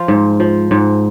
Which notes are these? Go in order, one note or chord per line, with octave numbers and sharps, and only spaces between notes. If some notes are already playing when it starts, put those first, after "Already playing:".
Already playing: F3 F4
G#2
F3
G#2